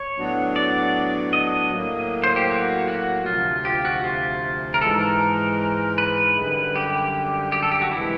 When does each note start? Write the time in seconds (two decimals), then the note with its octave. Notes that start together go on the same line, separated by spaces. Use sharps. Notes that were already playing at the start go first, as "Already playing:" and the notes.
Already playing: C#5
0.17 A2 F#3 B3 D4 F#4
0.56 D5
1.33 D#5
1.72 A2 F#3 A#3
2.24 C5
2.36 G4
2.50 F#4
2.88 F#4
3.26 D2 C3 F3 F4
3.65 G4
3.85 F#4
4.04 F4
4.74 A#4
4.82 G#2 E3 G#3 A4
5.00 A#4
5.98 B4
6.37 F#2 D3 G3
6.76 G4
7.52 G4
7.63 A4
7.71 G4
7.82 F#4
7.91 C3 E3 G#3 E4